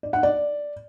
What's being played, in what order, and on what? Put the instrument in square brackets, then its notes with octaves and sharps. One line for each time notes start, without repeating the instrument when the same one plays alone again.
[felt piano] D5
F#5
D5